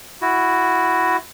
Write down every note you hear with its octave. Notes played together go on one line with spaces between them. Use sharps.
E4 F#4